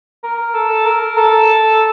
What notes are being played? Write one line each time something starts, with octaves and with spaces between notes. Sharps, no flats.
A#4
A4
A#4
A4